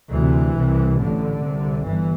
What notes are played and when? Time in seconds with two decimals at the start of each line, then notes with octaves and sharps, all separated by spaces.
0.11 D2 C3 E3
0.54 C2 C3
0.97 A1 A2 D3
1.41 C2 C3
1.84 G1 G2 E3